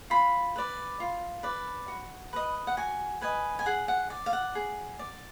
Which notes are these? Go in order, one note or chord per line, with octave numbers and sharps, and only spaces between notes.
F4 B5
B4 D5
F4
B4 D5
F#4
B4 D#5
F#5
F#4 G#5
B4 D#5 G#5
G#5
G#4 F#5
F#5
D5
F5
F#5
G#4
D5